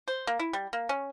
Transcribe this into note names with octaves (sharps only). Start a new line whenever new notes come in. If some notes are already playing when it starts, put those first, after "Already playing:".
C5
A#3
E4
G3
A#3
C#4